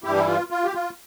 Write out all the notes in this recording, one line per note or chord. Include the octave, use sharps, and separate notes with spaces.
G2 E3 G3 E4 G4
E4
F4
F4
G4
F4